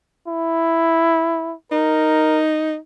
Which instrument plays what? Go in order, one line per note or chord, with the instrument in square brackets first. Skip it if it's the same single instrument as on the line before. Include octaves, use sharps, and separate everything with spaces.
[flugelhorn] E4
[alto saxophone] D#4 [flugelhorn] A#4